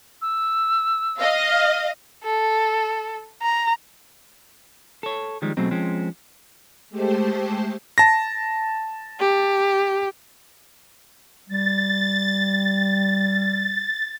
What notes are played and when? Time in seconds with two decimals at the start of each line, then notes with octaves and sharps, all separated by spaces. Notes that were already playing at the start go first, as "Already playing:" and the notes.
0.22 E6
1.19 D#5 F5
1.51 F6
2.24 A4
3.42 A#5
5.03 A4 C#5
5.42 D#3 F3 G3 G#3
5.57 B2 F#3 G#3 A3 C4
5.71 F3 G#3 C4 C#4
6.89 G#3 A3 G4 C5 A5
7.98 A5 A#6
9.19 G4
11.49 G3 A6